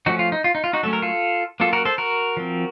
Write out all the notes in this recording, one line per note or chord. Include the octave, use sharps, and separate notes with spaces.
F3 A3 C#4 D#4 F#4
F4
D#4
F4
D#4
F4
D#4 F#4
F#3 A3 C#4 A4
A#4
F4 A4
F#3 A#3 C#4 F4 A4
F#4 A#4
A4 C5
F#4 A#4
F3 C4